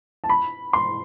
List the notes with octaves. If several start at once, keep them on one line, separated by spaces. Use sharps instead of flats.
A5
B5
C6